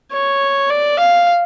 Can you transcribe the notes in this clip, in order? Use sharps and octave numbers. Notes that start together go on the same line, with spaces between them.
C#5
D5
F5